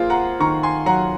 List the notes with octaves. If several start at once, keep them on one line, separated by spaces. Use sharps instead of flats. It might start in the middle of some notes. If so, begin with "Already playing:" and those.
Already playing: A#3 F4 G#4 A#4 C5
F#5 A#5
D#3 A#5 C#6
G#5 C6
F#3 F#5 A#5